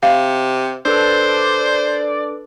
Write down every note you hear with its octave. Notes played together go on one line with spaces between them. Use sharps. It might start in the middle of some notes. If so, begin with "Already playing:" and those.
C3 F5
D4 A4 B4 C5 D5